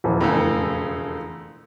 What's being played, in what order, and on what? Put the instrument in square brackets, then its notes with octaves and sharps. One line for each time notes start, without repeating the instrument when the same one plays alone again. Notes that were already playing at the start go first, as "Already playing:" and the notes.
[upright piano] D#1 E3 F3
[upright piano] E1 [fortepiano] F2 A2 C#3